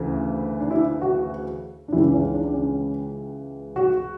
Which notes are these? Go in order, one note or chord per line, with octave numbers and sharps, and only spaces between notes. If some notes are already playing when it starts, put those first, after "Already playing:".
Already playing: D2 C#3 E3
D4
E4
F#4
D4
C#2 C#3 E3 E4
C#4
D4
C#4
F#4